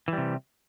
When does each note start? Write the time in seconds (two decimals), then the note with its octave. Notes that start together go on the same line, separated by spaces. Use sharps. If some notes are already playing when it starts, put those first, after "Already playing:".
0.08 E3
0.13 G3
0.18 C3